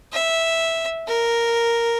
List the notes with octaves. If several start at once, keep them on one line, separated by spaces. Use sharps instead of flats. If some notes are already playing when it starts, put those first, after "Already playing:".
E5
A#4